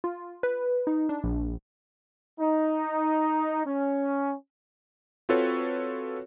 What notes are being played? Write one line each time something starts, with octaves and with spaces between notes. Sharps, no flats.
F4
B4
D#4
D4
A#1
D#4
C#4
C4 F4 F#4 A4 B4 C#5